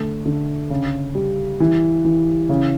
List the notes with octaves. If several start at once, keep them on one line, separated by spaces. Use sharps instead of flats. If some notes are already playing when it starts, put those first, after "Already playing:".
Already playing: D3 A3
D3
C#3
G3
E3
E3
C#3